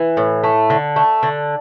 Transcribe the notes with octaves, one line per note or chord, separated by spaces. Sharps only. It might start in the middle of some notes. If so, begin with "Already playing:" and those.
Already playing: E3
A2
A3
D3
A3
D3